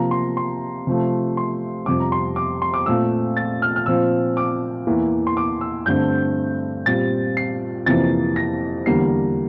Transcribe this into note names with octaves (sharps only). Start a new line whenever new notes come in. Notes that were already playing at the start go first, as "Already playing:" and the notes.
Already playing: C3 F3 A#3 A#5
C6
C6
C3 F3 A3
C6
F2 C3 G3 D6
A#5
C6
D6
C6
D6
A#2 A3 C4 E6
A6
F6
F6
A#2 F3 C4 E6
D6
E2 E3 A#3
C6
D6
E6
G2 D3 A3 C4 G6
A#2 G3 C4 A6
C7
F2 C3 E3 A#3 A6
A#6
E2 D3 G3 A#3 C7